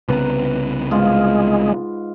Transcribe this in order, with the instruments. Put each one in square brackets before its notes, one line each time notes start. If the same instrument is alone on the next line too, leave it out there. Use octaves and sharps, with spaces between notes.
[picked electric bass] C2 C#3 B3 [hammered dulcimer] B4 A#5
[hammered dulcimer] G#2 F4 [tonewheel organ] G#3